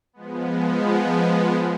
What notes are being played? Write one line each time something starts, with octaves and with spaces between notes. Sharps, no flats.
F3 G#3 B3